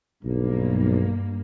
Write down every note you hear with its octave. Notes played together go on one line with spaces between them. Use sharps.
B1 G2 A#3